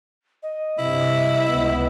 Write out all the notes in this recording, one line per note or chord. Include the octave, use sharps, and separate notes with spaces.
D#5
G2 C3 E4
C#2 B3